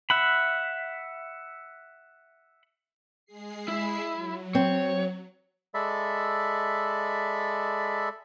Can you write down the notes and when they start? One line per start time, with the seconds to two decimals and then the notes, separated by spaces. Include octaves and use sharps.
0.10 E5 F#5 B5
3.26 G#3 G#4 C7
3.68 E4
4.08 F#3
4.55 C4 C#5
5.74 G#3 A4 D5 E5 B5